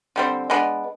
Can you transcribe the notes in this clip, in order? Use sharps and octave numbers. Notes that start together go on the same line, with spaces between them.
D3 G3 C4
G#3 B3 D4